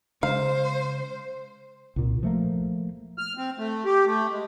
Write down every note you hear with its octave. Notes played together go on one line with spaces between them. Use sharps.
C#3 G#3 C5 F5
C2 A#2
F3 A3 A#3
F6
C4
A3
G4
A3
G#3